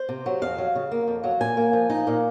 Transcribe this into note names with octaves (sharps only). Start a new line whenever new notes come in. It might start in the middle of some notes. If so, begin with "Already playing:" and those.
Already playing: C5
C3
F#3
F2 F5
F#3
C#3
A#3
F2
F#3
A#2 G#5
A#3
F3
D#4
A#2